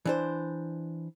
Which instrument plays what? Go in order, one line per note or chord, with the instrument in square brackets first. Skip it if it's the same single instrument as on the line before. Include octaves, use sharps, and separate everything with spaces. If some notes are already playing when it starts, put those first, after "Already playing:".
[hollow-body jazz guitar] E3 D4 C5